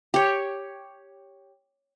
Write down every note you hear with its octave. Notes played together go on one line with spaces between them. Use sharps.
G4 C#5